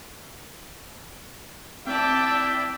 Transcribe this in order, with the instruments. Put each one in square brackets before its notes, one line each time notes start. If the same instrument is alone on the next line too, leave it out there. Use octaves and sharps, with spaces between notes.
[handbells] C4 [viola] E4 D5 [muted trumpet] E5 [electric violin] G5 A5